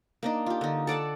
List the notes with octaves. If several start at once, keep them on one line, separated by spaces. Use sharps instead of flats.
A#3 D4 D#4
F4 G4
D3 D#4
A4 D5 F#5 A5